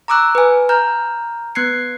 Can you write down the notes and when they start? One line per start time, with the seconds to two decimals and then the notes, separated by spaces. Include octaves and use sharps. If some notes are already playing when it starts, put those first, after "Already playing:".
0.08 A#5 C#6 D6 E6 F#6
0.35 B4 G#5
0.69 A#5 F6 G6
1.55 B3 F#6 G#6 C7 C#7